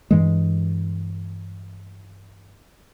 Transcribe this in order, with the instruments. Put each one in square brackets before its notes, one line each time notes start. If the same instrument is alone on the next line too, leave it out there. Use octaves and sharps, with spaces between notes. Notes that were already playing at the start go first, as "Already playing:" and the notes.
[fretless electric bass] G2 E3 G#3